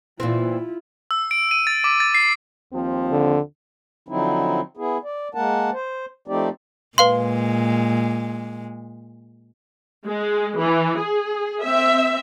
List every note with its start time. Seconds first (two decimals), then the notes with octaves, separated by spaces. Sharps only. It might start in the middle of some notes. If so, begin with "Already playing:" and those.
0.20 A#2 E3 C4 E4 F4
1.11 E6
1.31 D7
1.51 D#7
1.67 A6
1.84 D6
2.00 A6
2.14 C7
2.73 D#2 F3 C4
3.12 D3
4.09 D3 F3 F#3 C4 D#4 E4
4.77 B3 E4 G#4
5.04 D5
5.35 G#3 A#3 A#4 F#5 A5
5.72 C5
6.28 F3 A3 C4 D#4 G4 D5
6.98 A#2 G#3 B4 F5 C6
10.06 G#3
10.58 E3
10.99 G#4
11.62 C4 E5